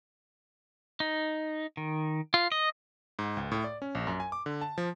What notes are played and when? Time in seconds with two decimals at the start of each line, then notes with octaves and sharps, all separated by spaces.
1.00 D#4
1.77 D#3
2.34 F4
2.52 D#5
3.19 G#2
3.37 C#2
3.52 A2
3.64 D5
3.82 C#4
3.95 A#1
4.07 F#2
4.20 G#5
4.32 D6
4.46 D3
4.61 A5
4.78 F3